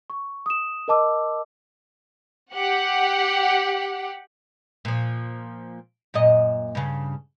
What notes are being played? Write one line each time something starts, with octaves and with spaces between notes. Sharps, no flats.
C#6
D#6 E7
A#4 D#5 A5 D6 E6
G4 F#5
A#2 F3
F#2 A#2 D#5
G2 C#3